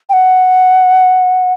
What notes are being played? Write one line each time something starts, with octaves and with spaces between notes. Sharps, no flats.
G5
F#5